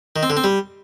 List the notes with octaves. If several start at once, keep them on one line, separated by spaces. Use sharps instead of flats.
D#3
C4
D3
C4
G3